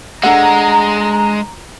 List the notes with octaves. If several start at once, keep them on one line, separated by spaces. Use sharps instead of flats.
G#3 D4 A4 F#5 A#5